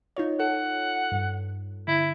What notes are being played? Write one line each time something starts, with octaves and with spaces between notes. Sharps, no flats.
D#4 F4 C#5
A4 F#5
G2
D3 E4